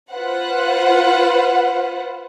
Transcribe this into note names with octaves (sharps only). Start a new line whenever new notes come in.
F4 B4 C5 F#5